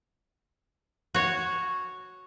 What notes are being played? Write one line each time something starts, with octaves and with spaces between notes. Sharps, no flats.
F#4 C#5